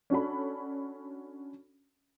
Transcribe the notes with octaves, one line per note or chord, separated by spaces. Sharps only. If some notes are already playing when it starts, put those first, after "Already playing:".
C#4 D4 F#4 A4 B5